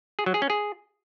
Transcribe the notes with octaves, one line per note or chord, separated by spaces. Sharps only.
G#4
F#3
G#4
C#4
G#4